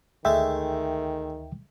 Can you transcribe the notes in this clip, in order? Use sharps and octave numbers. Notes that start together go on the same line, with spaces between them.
D2 D#3 G#3 A3 E5 G5